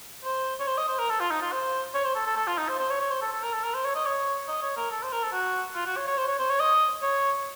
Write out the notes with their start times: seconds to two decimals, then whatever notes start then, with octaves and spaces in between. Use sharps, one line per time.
0.24 C5
0.59 C#5
0.67 C5
0.77 D#5
0.88 C5
0.98 A#4
1.09 A4
1.20 F4
1.30 D#4
1.41 F4
1.52 C5
1.94 C#5
2.04 C5
2.15 A4
2.26 A4
2.36 A4
2.47 F4
2.57 D#4
2.68 C5
2.78 C5
2.89 C#5
3.00 C#5
3.10 C5
3.21 A4
3.31 A4
3.42 A#4
3.53 A4
3.63 A#4
3.74 C5
3.84 C#5
3.95 D#5
4.06 C#5
4.48 D#5
4.62 C#5
4.76 A#4
4.90 A4
5.02 C5
5.12 A#4
5.23 A4
5.32 F#4
5.75 F4
5.86 F#4
5.96 C#5
6.07 C#5
6.17 C5
6.27 C#5
6.38 C5
6.49 C#5
6.60 D#5
7.02 C#5